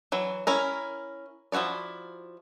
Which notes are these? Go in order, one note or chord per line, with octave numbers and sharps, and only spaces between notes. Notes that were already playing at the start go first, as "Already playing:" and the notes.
E3 F#3
C#4 E4 A#4
F3 E4 F#4 C#5 D5